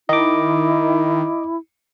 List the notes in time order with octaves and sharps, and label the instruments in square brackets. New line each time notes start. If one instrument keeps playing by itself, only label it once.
[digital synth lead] D#3 [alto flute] E4 [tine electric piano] D#5 D6